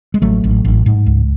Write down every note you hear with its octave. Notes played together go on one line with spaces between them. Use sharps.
G#3
A1 F#3 A3
A1
A1
G#2
C#2